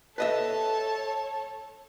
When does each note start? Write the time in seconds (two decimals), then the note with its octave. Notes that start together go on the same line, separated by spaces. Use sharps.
0.18 A4 B4 C#5 D#5 E5 A5